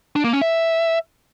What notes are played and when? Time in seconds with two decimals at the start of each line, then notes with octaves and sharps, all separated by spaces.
0.16 D4
0.24 A#3
0.33 C#4
0.42 E5